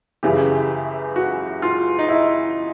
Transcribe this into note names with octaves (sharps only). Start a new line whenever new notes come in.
F#2 C#3 E3 G4
F#4
F4
D#4
E4